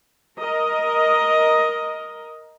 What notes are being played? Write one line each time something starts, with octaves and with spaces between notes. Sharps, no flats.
A#4 D#5